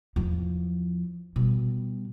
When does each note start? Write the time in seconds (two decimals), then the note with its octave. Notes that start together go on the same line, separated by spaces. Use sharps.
0.16 E2 F3
1.36 B2 G3